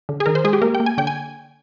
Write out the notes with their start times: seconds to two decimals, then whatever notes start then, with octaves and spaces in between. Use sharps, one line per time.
0.09 D3
0.20 G#4
0.26 D#3 A#4
0.35 C5
0.44 G#3 G#4
0.53 G4
0.62 A#3 A#4
0.75 G5
0.80 A#3
0.86 G#5
0.98 D3 G5
1.07 G#5